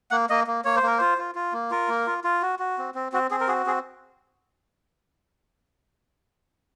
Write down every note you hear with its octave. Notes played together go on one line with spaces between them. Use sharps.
A#3 F#5
A#3 D#5
A#3
A#3 C#5
C5
A#3 A#4
F4 C5
F4
F4
A#3
F4 A#4
A#3
F4
F4
F#4
F#4
C4
C4
C4 F#4
C4 G#4
A#4
F#4 G#4
C4 G#4